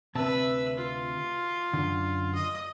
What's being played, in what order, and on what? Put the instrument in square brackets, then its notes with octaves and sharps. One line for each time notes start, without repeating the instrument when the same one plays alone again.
[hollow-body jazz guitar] D2 C3 A5 [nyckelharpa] B4 E5
[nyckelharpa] F4
[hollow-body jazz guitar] F#2 A2 D3
[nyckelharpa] D#5